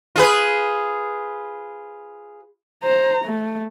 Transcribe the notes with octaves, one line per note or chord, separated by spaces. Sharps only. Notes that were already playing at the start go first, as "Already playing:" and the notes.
F4 G#4 B4
C5 A#5
A3